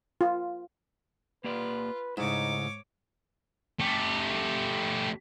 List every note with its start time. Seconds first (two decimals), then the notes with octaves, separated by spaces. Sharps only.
0.21 F4
1.44 A#3 F4 G4 B4 D5
2.17 G#2 C#3 A3 D#4 E4 C#5 D6
3.80 A3 G4